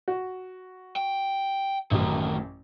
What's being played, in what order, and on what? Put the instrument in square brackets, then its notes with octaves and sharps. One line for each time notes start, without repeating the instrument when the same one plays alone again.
[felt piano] F#4
[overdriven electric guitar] G5
[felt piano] A1 F#2 [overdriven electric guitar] A2 D#3